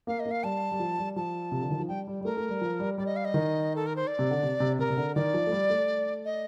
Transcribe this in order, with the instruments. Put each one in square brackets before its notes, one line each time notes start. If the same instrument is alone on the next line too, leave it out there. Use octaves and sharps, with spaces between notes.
[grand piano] A#3 [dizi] F5
[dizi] D#5
[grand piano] A#3
[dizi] F5
[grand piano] G3 [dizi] A5
[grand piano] G3
F3
G3
[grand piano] F3 [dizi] A5
[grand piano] C3
D3
D#3
F3
[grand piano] G3 [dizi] G5
[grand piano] G3
G3
[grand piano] A3 [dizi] A#4
[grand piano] A3
G3
F3
G3
[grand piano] G3 [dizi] D5
[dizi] D#5
F5
D#5
[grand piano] D#3
[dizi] A4
A#4
C5
D5
[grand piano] C3
D3
C3
C3
[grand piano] C3 [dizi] A#4
[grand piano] C3
D3
[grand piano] D#3 [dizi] D5
[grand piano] F3
A3
G3
A3
[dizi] D#5